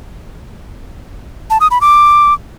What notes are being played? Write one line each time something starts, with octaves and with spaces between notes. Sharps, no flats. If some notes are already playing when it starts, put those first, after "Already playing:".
A5
D#6
B5
D6